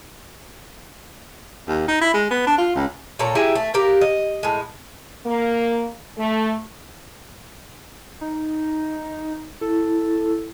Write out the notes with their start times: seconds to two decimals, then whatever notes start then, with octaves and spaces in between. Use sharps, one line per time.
1.68 D#2
1.88 D#4
2.01 E4
2.14 G#3
2.31 B3
2.47 D4
2.58 F4
2.75 C#2
3.19 A#2 A4 C#5 A#5
3.35 D#4 E4 G4 G#4
3.55 A3
3.74 G4 A#4 F5
4.01 D#5
4.43 A2 G#3
5.26 A#3
6.18 A3
8.21 D#4
9.61 E4 A4